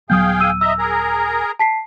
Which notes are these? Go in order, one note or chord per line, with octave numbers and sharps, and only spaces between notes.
D#1 F#3 B3 G#4 F5 G5 D#6 G6
E6 D#7
D#5 E5 A#5 E6
G#4 A#4 A#5
A5 B6 C7